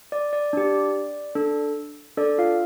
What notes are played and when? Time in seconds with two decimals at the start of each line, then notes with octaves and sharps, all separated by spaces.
0.12 D5
0.33 D5
0.53 D4 G4
1.35 D4 A4
2.17 D4 A4 D5
2.38 F4 F5